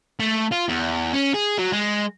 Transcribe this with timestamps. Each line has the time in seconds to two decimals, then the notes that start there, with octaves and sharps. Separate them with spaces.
0.20 A3
0.52 F4
0.69 E2
1.13 C#4
1.34 G#4
1.59 F#3
1.72 G#3